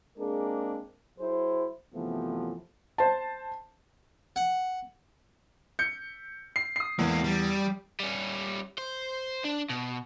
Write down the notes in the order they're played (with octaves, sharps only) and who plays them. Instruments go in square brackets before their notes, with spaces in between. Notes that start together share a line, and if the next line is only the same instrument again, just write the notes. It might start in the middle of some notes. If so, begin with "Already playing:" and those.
[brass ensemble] G#3 A#3 C4 D4 G#4 A#4
F#3 E4 G#4 C5
F#2 C3 E3 F3 A3 B3
[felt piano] C5 A5
[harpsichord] F#5
[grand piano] G6 C#7
C7
D#6 C7
[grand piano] E2 [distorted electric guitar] G#3 A#3
[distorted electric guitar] G3
[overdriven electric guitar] G3 C#4
C5
D4
B2